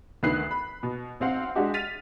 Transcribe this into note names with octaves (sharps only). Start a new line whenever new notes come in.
D2 D#3 B3 B4 F#6 C7
B5
B2
B1 C4 F5 F#5
G#3 D4 F#4 G4
F6 A6 B6 D#7 F7